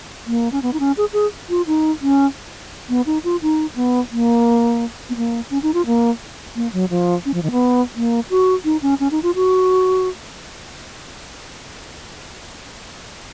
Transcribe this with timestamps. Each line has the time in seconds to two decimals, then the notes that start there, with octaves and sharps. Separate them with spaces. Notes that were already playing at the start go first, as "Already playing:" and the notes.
0.27 A#3
0.52 C#4
0.62 B3
0.73 D#4
0.80 C#4
0.97 G#4
1.13 G#4
1.50 F4
1.67 D#4
2.02 C#4
2.89 B3
3.06 D#4
3.24 F4
3.42 D#4
3.76 B3
4.11 A#3
5.10 B3
5.16 A#3
5.50 C#4
5.63 D#4
5.74 F4
5.86 A#3
6.56 A#3
6.73 F#3
6.90 F3
7.25 C#4
7.34 F3
7.43 D#3
7.51 B3
7.96 A#3
8.30 F#4
8.65 D#4
8.82 C#4
9.00 C#4
9.11 D#4
9.23 F4
9.35 F#4